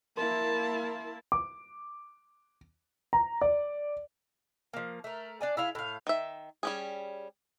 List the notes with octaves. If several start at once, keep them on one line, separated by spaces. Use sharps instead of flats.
A#3 E4 A#4 A5 C6
D6
A#5
D5
F3 A#3
A3 A#4
D4 D5 G#5
E4 G#4 F5
A2 F5
D#3 E5
G3 C#4 G#4